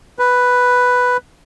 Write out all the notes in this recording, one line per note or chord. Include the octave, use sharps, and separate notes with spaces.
B4